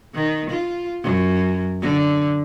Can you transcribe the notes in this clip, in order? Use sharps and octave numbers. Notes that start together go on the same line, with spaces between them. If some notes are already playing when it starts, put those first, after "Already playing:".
D#3
F4
F#2
D3